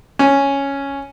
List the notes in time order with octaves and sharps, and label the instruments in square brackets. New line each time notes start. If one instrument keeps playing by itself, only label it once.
[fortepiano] C#4